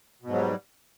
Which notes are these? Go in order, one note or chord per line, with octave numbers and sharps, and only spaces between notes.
G#2 B2 F#3 G3